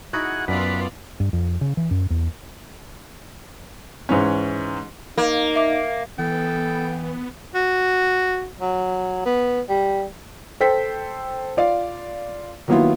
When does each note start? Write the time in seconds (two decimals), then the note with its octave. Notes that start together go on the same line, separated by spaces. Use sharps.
0.13 D#4 E4 F#4 G#4 F#5
0.48 F#2 B3 F4 B4 D5
1.20 G2
1.33 F2
1.61 C#3
1.77 E3
1.91 F#2
2.10 E2
4.09 G#2 E3 C#4
5.18 A#3 D#4
5.56 E5 D6
6.19 E3 B3 A4 G5
7.55 F#4
8.61 F#3
9.25 B3
9.69 G3
10.60 A4 C5 G5 B6
11.57 F4 D5 F5
12.68 D#3 F#3 A#3 B3 E4 F4